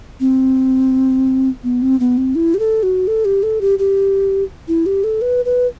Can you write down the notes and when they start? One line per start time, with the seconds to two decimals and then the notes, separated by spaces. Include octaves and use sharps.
0.20 C4
1.64 B3
1.82 C4
2.00 B3
2.17 C4
2.35 E4
2.54 G4
2.59 A4
2.83 F#4
3.07 A4
3.25 G4
3.43 A4
3.61 G4
3.79 G4
4.68 E4
4.86 G4
5.04 A4
5.22 B4
5.45 B4